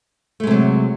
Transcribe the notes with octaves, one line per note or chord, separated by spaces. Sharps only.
C3 F#3 G#3 A3